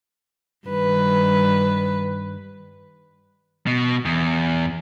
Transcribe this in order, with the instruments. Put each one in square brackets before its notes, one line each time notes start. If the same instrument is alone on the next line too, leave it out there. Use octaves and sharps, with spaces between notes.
[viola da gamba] G2 D#3 B4
[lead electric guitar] B2
E2